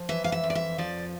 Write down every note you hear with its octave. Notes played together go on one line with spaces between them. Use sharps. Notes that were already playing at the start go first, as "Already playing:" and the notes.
Already playing: F3
E3 E5
F5
E5
F2
D5
E5
F3 D5